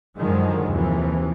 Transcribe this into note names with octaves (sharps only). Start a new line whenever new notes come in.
F#2 D3 D#3 F3 G#3
D#2 C3 E3 F3